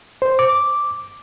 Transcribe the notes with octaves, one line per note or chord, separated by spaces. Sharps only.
C5
D6